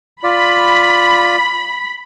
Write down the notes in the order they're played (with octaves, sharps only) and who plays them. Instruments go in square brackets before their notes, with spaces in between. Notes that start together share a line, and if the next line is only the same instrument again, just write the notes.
[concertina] F4 D5 [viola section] B5